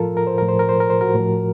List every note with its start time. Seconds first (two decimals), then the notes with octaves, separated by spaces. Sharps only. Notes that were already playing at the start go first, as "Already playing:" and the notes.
Already playing: A2 F3 F4 A4 A#4
0.17 A#4
0.27 C5
0.38 A2 F3 A#4
0.49 C5
0.59 A#4
0.69 C5
0.80 A#4
0.90 C5
1.01 F#4 A#4
1.14 A2
1.20 F3